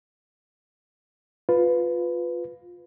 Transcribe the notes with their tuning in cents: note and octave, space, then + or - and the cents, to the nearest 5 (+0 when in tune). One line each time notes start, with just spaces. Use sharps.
F4 +15 B4 +10